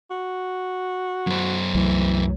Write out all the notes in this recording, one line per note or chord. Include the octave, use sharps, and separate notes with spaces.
F#4
F#2 C5
C2 E3 F#3 A3